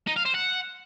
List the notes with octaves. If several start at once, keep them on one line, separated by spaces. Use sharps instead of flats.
D#4
F5
C5
F#5